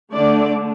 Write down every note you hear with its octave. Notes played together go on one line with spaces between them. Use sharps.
D3 A3 D4 D5